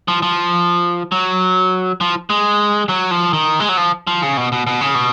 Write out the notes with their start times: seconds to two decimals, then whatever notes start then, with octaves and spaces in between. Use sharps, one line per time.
0.08 F3
0.22 F3
1.12 F#3
2.01 F3
2.30 G#3
2.89 F#3
3.11 F3
3.33 D#3
3.60 G#3
3.69 F#3
3.77 F3
4.07 F3
4.22 C#3
4.37 B2
4.52 B2
4.67 B2
4.81 C#3
4.95 B2